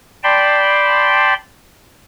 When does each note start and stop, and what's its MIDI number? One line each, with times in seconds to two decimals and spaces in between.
0.24 1.34 74
0.24 1.34 79
0.24 1.34 81
0.24 1.34 83
0.24 1.34 84